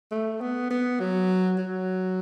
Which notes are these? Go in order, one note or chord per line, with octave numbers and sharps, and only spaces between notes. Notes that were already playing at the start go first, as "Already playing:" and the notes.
A3
B3
B3
F#3
F#3